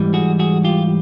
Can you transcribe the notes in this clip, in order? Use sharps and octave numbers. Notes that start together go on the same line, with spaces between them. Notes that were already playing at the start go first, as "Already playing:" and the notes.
Already playing: G#2 E3 G3
F#4 G#4
F#4 G#4
F4 G4